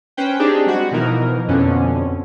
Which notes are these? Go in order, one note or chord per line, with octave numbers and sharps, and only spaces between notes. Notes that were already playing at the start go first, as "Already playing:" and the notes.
C#4 B4 C5 G5
C4 D4 D#4 G4 G#4
G3 G#3 F#4
B2 E3 F3 D#4 A#4
F2 B2 D3 C#4